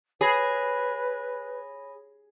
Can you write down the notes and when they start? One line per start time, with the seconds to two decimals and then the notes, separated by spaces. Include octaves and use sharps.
0.21 G#4 B4 C#5 B5 A#6